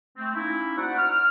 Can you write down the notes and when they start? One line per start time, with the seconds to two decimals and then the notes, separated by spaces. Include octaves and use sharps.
0.18 A3 C4
0.35 A#3 C#4 D#4 E4
0.77 D#4 F#4 C5 D5 F#5
0.98 F6